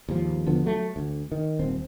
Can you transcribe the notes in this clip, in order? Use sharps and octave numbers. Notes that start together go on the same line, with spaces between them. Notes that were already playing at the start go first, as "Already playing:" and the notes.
D#2 G#2 F3
E1 D3 F3 B3
F#3 A3
D2
D#3
D#1 C4